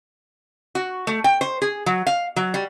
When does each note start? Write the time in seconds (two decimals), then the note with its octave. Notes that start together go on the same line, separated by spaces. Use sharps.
0.75 F#4
1.07 A3
1.24 G5
1.41 C5
1.62 G#4
1.86 F#3
2.07 F5
2.36 F#3
2.54 G3